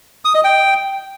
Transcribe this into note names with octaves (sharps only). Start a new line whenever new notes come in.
D#6
D#5
G5